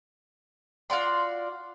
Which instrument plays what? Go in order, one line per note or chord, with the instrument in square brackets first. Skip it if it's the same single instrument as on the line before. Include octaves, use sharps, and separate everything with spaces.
[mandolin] F4 F#4 D5 C6